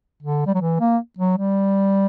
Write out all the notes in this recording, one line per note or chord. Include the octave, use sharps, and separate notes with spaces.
D3
G3
F#3
E3
A#3
F#3
G3